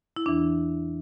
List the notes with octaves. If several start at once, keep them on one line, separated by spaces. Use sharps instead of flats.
E4
E2 E3 D4